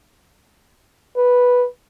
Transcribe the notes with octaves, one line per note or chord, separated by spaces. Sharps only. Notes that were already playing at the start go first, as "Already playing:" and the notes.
B4